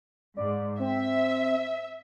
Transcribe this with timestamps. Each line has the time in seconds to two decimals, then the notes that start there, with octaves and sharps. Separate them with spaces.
0.37 G#2 D5
0.79 C4 E5